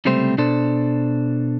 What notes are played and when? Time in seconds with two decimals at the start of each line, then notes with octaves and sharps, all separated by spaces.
0.05 C#2 C3 G3 A3 C4 C5
0.38 B2 D4 A4 C5